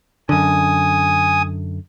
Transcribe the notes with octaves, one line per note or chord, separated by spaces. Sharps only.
F#2 D3 G#5 D#6